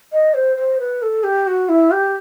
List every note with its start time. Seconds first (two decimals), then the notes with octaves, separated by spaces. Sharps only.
0.13 D#5
0.34 C5
0.56 C5
0.79 B4
1.02 A4
1.24 G4
1.47 F#4
1.69 E4
1.91 G4